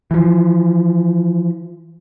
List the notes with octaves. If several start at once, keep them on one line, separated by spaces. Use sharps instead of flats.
E3 F3